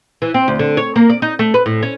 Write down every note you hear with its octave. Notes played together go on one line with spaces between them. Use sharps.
E3
C4
D2
D3
C#5
A#3
D5
D#4
A3
B4
A2
C#4